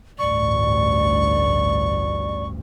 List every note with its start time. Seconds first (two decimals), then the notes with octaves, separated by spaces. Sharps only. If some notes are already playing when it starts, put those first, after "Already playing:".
0.19 A1 D2 G2 D5 C#6